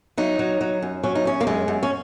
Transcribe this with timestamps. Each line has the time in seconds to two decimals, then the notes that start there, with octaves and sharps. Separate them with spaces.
0.18 F#3 D#4
0.39 F#3
0.61 F#3
0.82 F#2
1.04 F#3 C#4
1.15 D#4
1.25 F#2 C#4
1.41 A#3
1.47 F#2 G#3
1.68 F#2
1.83 C#4